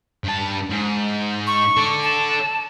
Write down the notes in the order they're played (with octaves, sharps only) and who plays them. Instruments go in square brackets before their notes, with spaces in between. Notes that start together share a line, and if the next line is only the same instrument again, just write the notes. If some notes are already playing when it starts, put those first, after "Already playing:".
[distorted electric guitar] G2 A5
G#2
[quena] C#6
[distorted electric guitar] A4 D5
[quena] A5